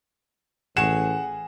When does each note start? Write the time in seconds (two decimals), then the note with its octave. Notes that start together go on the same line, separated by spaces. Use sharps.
0.77 A1 G#4 F#5 C#6 E7